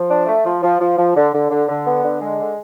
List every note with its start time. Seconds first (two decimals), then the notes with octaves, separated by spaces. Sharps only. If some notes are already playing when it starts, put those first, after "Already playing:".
Already playing: F3
0.09 D4
0.27 A3
0.44 F3
0.63 F3
0.80 F3
0.97 F3
1.15 D3
1.33 D3
1.50 D3
1.68 D3
1.85 B3
2.03 D3
2.21 G#3
2.38 D3